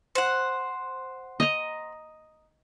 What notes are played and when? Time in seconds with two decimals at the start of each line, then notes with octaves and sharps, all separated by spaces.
0.15 C5 F#5
1.40 D#5 A#5